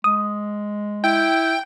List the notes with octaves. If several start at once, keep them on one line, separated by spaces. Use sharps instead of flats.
G#3 D#6
E4 G5